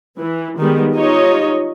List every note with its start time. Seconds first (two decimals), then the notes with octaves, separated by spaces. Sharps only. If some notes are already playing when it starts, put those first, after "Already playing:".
0.18 E3
0.58 D#3 G3 G#3 B3
0.93 D#4 F4 G4 C#5 D#5